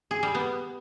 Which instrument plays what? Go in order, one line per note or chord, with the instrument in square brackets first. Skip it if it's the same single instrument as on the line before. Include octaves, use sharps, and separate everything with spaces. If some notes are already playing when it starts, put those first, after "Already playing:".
[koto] G#4
G3
B3